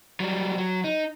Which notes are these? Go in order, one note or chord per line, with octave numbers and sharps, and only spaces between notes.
F#3 G3
F#3
D#4